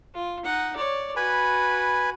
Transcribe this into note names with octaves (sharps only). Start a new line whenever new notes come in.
F4
D#4 F#5
C#5 D5
F#4 B4 G#5 B5